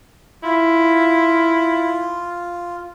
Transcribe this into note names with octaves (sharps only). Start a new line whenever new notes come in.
E4 F4